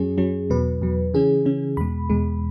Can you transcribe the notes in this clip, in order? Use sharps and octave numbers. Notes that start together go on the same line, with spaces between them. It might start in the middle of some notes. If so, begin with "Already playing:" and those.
Already playing: F#2 F#3 C#4 G#4
F#2 F#3 C#4
E2 B2 F#3 B4
E2 B2 F#3
C#3 E3 C#4 G#4
C#3 E3 C#4
E2 B2 G#3 B5
E2 B2 G#3